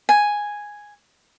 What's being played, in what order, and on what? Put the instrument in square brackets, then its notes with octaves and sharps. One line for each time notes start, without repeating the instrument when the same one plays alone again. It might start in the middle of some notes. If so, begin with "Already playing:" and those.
[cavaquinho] G#5